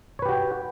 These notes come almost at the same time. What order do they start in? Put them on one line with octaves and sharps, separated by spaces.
C#5 B4 G4 F#4 G5